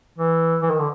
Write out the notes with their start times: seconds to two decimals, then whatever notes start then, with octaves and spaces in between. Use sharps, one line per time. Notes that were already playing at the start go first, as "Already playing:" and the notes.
0.18 E3
0.62 E3
0.70 D#3
0.79 D3